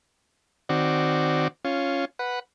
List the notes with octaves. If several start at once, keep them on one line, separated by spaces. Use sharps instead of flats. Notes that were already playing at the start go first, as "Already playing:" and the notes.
D#3 C4 F#4 D5
C#4 F4
B4 F#5